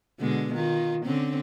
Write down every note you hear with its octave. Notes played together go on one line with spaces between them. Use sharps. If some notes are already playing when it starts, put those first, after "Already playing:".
B2 D3 G#3
D#3 F4
D3 C4 C#4